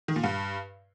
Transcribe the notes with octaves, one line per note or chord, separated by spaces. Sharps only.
D#3
A#2
G2